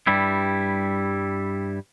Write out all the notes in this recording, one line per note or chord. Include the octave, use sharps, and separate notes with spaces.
G2 G3 E4